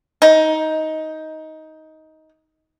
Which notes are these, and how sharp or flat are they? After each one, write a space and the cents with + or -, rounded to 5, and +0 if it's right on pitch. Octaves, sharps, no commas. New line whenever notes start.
D#4 +15